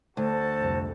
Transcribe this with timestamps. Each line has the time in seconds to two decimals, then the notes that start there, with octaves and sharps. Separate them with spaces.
0.17 D2 F#4 A4 C5 A5
0.60 C2 F2